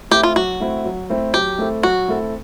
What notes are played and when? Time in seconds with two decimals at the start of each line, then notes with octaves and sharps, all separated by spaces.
0.11 A3 C4 E4 G4
0.23 F4
0.36 F#3 F#4
0.60 A3 C4 E4
0.85 F#3
1.10 A3 C4 E4
1.34 F#3 G4
1.58 A3 C4 E4 A4
1.83 F#3 F#4
2.08 A3 C4 E4 A4